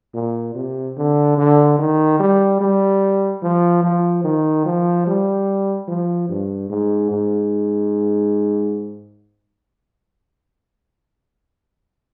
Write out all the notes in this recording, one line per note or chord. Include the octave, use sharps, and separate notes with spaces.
A#2
C3
D3
D3
D#3
G3
G3
F3
F3
D#3
F3
G3
F3
G2
G#2
G#2